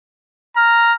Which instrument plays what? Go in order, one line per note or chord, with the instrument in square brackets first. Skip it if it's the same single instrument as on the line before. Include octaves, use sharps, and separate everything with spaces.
[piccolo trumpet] A#5 [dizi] F6